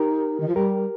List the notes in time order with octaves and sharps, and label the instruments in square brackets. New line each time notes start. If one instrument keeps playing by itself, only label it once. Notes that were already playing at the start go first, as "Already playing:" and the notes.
Already playing: [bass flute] D#4 [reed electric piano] G4 A#4
[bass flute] D#3
F3
[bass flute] G3 [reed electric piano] G4 A#4